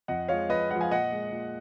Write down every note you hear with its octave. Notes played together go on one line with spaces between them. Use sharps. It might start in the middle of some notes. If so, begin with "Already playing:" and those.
F2 D#5 F#5
F3 G#3 C#5 F5
F2 B4 D#5
F3 G#3 D#5 F#5
F5 G#5
A#2 D#5 F#5
G#3
A#2